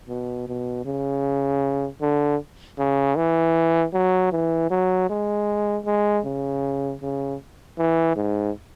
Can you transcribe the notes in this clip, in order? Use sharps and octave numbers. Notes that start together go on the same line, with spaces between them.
B2
B2
C#3
D3
C#3
E3
F#3
E3
F#3
G#3
G#3
C#3
C#3
E3
G#2